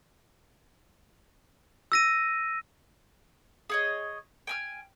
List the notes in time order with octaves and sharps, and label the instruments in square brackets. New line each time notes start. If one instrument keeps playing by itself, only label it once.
[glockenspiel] E6 A#6 D#7
[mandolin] G#4 C#5 D#5
G5 G#5 F6